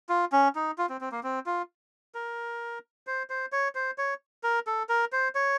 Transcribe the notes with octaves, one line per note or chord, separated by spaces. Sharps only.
F4
C#4
D#4
F4
C4
C4
A#3
C4
F4
A#4
C5
C5
C#5
C5
C#5
A#4
A4
A#4
C5
C#5